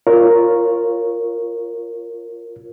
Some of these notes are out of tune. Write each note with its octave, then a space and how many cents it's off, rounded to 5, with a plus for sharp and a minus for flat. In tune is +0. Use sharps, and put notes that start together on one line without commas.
F4 +5 A#4 +0 C#5 -5